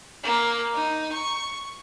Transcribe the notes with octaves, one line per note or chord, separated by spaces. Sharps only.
A#3
D#4
C#6